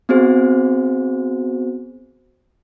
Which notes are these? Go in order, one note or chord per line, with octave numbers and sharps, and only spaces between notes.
B3 C4 F#4 G#4 C5